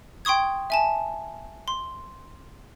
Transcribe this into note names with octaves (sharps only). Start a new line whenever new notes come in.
G5 C6 C#6 D#6 G#6
E5 G#5 A5
C6